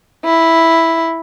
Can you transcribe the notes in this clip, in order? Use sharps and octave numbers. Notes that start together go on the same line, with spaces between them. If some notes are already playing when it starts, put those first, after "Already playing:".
E4